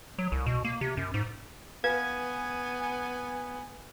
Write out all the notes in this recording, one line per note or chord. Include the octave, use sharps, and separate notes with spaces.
F#3
C2
B2
A#3
C3
F#2
G#2
B3 B4 F5 G#5 G#6